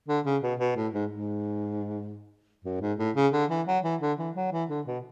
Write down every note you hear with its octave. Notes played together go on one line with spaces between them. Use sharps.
D3
C#3
B2
B2
A2
G#2
G#2
F#2
G#2
A2
C#3
D3
E3
F#3
E3
D3
E3
F#3
E3
D3
B2